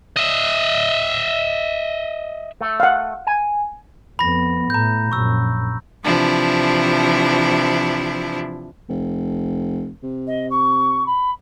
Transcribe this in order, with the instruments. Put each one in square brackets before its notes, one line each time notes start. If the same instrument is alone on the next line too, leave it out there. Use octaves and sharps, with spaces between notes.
[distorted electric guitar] D#5 E5
[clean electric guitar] A3
[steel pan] F5 F#5
[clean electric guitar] G#5
[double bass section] F2 B3 [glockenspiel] B5 A#6
[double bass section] A2 [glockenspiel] A#5 G6
[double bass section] A#1 F#2 [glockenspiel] C#6 E6
[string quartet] C3 E3 F3 D4 E4
[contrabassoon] F1
C3
[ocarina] D#5
C#6
B5